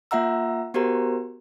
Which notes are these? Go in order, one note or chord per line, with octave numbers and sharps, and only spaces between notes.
A#3 F4 E5 F#5 A#5 E6
B3 F#4 G4 A#4 C5 A#5